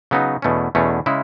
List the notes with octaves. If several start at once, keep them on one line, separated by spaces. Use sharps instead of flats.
C#3 F#3 B3 D#4
E2 B2 A3 C#4
E2 B2 A3 C#4
C#3 G#3 C#4 E4